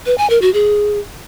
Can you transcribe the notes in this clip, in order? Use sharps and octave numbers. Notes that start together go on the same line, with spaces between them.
B4
G#5
A#4
F#4
G#4